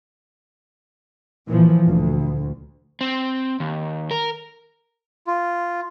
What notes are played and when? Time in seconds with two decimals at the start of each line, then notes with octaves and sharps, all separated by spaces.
1.48 A#2 E3 F3
1.87 D2
3.01 C4
3.60 D#2
4.11 A#4
5.27 F4